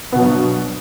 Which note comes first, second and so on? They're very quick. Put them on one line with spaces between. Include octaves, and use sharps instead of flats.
B3 B2 F#3 G2